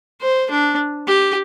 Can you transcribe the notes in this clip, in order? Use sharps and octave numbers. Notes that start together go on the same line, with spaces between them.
C5
D4
G4